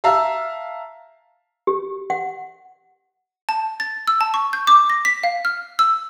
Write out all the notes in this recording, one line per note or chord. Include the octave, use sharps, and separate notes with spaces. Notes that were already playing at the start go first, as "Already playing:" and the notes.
E5 F5 A5 A#5 E6
G4
F#5
A5
A6
E6
A5
C#6
G6
D6
A#6
B6
F5
F6
E6